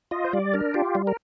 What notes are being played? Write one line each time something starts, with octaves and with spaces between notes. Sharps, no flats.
F4 D#5
C5
G3 D5
D4 A#4
F4 G4
G3
A#4